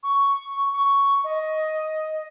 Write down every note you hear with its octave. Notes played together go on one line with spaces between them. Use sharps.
C#6
C#6
D#5